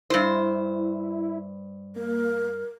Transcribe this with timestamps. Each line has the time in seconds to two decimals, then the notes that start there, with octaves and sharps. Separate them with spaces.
0.10 G2 E4 C5
1.96 A#3 A#4